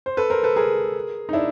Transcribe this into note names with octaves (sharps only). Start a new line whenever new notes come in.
C5
A4 B4
A#4 C5
A4 B4
G#4 A#4
D#4
D4 E4